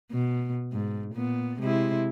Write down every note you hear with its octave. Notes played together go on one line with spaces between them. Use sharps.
B2
G#2
A#2 B3
C3 G#3 E4